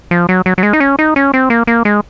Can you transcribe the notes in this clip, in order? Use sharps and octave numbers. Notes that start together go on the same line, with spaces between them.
F3
F#3
F#3
F#3
G#3
D#4
C#4
D#4
C#4
C4
A#3
A#3
G#3